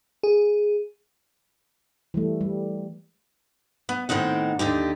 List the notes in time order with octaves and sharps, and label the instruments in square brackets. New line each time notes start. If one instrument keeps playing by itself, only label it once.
[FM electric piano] G#4
[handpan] E3 G3 A3
G3
[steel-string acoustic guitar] B3
A2 D#3 C4 D#4 F#5
D#2 D3 D#4 G4